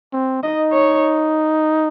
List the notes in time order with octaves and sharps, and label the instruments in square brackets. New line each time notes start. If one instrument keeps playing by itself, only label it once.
[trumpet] C4
[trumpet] D#4 [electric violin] D#5
[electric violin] C#5